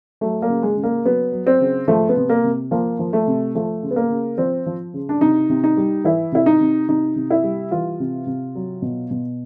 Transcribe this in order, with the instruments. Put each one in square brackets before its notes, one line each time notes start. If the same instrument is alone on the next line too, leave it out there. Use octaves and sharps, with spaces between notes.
[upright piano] F#3 A3
A#3
C#3
G#3
C#3
A#3
F#3 B3
F#3
C4
C#3
F3 A3
B3
C3
A#3
C3
F3 A#3
F3
A3
C3
F3 A3
C#3
B3
A#3
C#3
F3 C4
F3
C#3
D4
C3 D#4
C3
D#4
G3
E3 E4
C3 E4
D#4
C3
C3 D#4
C3
E4
G3
E3 F4
C3
C3
F#3
B2
B2